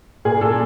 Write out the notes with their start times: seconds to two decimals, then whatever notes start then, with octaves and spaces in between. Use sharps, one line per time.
0.25 A#2 G#4
0.41 A#2 A4